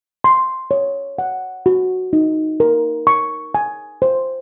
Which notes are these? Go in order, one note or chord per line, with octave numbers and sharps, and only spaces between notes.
C6
C#5
F#5
F#4
D#4
A#4
C#6
G#5
C5